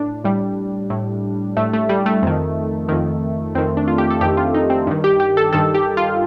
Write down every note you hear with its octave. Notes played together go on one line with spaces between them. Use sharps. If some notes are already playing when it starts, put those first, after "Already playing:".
Already playing: A2 D4
A2 G3
A2
A2 A3
A3
G3
A3
F2 D#3
F2 D#3
F2 D#3 C4
D4
F4
G4
A4
F2 D#3 G4
F4
D#4
C4
G2 D#3
G4
G4
A4
G2 D#3 A4
G4
F4